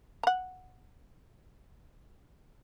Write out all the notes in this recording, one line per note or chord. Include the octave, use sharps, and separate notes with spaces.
F#5 A#5